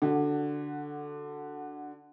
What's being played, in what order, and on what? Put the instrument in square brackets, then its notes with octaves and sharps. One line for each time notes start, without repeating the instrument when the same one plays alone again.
[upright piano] D3 F#4